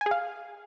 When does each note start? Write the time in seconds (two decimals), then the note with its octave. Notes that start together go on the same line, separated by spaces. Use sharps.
0.01 G#5
0.06 G#4
0.11 F5